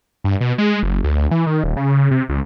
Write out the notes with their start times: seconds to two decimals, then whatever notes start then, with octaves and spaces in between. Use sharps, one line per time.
0.24 G2
0.41 B2
0.58 G#3
0.83 F#1
1.04 D2
1.31 E3
1.47 D#3
1.64 D#1
1.77 C#3
2.11 C3
2.29 C#2